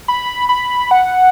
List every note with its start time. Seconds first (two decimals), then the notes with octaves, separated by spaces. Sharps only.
0.08 B5
0.49 B5
0.91 F#5